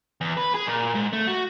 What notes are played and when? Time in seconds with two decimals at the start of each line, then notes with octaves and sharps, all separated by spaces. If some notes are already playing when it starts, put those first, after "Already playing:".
0.21 E2
0.37 B4
0.54 G#4
0.67 A#2
0.95 G#2
1.13 A3
1.27 F#4